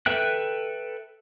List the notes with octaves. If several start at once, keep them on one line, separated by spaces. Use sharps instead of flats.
A4 B4 E5 G5 F#6